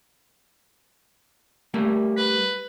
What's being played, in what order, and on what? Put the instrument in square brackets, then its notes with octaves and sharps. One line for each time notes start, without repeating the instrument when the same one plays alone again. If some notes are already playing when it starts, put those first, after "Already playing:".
[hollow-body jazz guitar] G3 A3 A#3
[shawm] B4